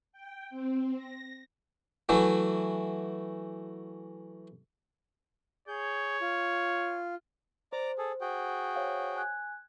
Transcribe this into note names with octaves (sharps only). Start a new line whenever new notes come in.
G5
C4
A#6
E3 F#3 A3
G#4 C#5 G6
F4
C5 D5 A#5 D6
G#4 A4
F#4 G#4 G5
C5 C#5 F5
G#5 F#6 G#6